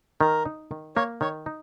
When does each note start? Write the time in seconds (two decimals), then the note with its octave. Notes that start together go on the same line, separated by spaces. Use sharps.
0.21 D#3 A#4
0.45 D#4
0.71 D#3
0.96 A#3 C#5
1.21 D#3 C#5
1.46 D#4